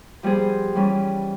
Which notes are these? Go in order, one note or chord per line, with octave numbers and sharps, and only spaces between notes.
F3 G3 B3 G#4 C5
E3 G3 C#4